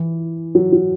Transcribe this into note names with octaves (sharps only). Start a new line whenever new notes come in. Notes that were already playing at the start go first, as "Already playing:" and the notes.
Already playing: E3
F#3
F#3